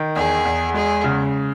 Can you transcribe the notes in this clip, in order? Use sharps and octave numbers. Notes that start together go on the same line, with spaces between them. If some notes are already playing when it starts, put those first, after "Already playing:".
Already playing: D#3
E2 G#4
E2
G#3 G#4
C#3